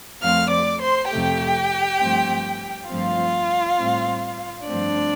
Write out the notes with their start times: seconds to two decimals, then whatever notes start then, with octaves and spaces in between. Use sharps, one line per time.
0.21 F2 F3 A3 C4 F5 F6
0.51 D5 D6
0.81 C5 C6
1.10 F2 C3 A3 G4 G5
1.99 G2 F3 A3 C4
2.88 G2 F3 A3 C4 F4 F5
3.78 A2 G3 C4
4.66 G2 F3 A3 C4 D4 D5